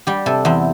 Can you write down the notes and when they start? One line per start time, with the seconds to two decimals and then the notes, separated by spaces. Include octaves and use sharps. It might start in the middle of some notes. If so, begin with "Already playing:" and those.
0.07 G3 G4
0.26 C3 A4
0.45 E2 C4